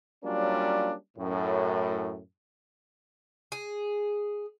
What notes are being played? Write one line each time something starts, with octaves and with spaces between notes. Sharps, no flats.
F#3 G3 A#3 C#4 D4 F4
F#2 A2
G#4